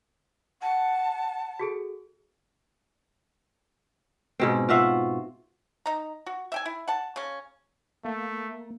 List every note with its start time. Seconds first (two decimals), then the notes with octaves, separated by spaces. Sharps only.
0.61 F#5 A5
1.60 F#4 G#4 A4
4.40 G#2 B2 C4
4.69 F4 F#4 E5 F5
5.86 D#4 A#5
6.26 F#4
6.52 E5 G5 G#5
6.66 E4
6.88 F#5 A5
7.16 C#3 C#4
8.05 A3 A#3